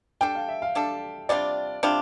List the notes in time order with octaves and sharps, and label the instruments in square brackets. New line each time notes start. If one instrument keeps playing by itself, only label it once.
[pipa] G3 D4 A4 [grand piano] G5
[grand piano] F5
E5
F5
[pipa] G3 D4 A4
[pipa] C3 G3 D4 F4 [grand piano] D5
[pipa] C3 G3 D4 F4